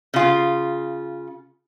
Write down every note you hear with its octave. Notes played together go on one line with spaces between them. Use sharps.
C#3 F4